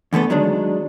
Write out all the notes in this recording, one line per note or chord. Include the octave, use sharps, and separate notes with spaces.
E2 D3 A3 B3 A4
D#3 F#3 G#3 D4